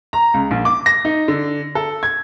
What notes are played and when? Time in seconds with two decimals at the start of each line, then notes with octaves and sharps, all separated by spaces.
0.13 A#5
0.34 C#2
0.51 A#1
0.65 D6
0.86 A#6
1.05 D#4
1.28 D3
1.75 A4
2.03 G#6